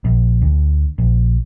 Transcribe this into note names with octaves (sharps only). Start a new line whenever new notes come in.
A#1
D2
A#1